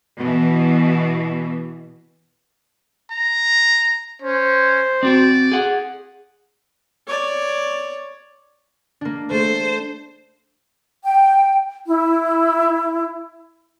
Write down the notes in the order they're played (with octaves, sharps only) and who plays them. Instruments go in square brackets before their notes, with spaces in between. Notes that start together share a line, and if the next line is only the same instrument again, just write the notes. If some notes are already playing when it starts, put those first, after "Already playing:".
[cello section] B2 E3
[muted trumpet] A#5
[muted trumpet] C#4 [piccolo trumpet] C5
[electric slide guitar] C4 F#4 [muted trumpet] D5
[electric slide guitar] G#4 F#5
[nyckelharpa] C#5 D5
[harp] A#3 D4
[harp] A3 A4 [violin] C5
[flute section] G5
E4